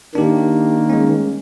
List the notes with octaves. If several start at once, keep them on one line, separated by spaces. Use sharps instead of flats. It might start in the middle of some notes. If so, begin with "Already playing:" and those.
D#3 A#3 D4 G4
G#3 C#4